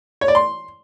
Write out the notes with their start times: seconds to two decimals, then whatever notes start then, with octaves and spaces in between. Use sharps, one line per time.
0.21 C#5
0.28 D5
0.35 C6